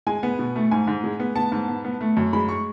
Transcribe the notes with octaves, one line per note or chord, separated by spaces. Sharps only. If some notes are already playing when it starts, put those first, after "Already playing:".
G#3 G#5
B3
B2
A3
G#2 G#5
G#2
G#3
B3
B3 A5
G#2
B3
B3
A3
F#2
G#3 B5
C#6